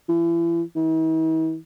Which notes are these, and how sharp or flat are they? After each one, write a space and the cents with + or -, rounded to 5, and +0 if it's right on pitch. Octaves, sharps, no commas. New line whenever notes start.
E3 +35
E3 -45